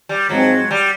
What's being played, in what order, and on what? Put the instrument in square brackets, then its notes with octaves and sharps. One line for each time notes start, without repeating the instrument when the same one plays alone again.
[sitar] G3
[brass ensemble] G#2 F3 G#3 C4 [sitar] F#3
[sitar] G3